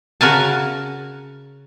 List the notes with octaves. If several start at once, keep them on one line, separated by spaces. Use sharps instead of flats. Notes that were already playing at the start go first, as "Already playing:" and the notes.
C#3 F#4 A#4 G#5 A5